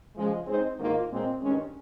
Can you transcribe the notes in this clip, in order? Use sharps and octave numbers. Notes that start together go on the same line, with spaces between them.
C#3 F3 G#3
G#3 C4 D#4 G#4 C5
G#2 D#3 A#3 F4
A#2 G#3 C4
G2 D#3 G#3 C#4